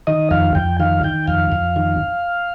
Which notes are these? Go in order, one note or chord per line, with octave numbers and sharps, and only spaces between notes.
D#3 D#5
F2 F5
F2 G5
D#3 F5
D#3 G5
F2 F5
F2
D#3